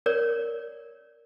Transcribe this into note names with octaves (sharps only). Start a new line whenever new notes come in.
A#4 C#5 D5